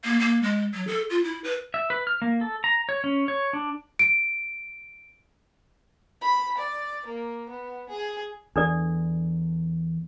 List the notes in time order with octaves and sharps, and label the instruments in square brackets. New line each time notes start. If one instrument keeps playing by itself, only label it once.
[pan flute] A#3
A#3
G#3
F#3
A4
F4
E4
B4
[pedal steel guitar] E5
B4
F6
A#3
A4
A#5
C#5
C#4
C#5
D4
[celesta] D7
[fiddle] B5
D5
A#3
B3
G#4
[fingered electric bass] E2 [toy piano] D4 A4 D5